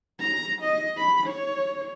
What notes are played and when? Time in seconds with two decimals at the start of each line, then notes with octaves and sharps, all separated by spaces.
0.20 A#5
0.62 D#5
0.97 B5
1.27 C#5